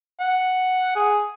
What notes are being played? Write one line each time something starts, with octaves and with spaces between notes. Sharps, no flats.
F#5
G#4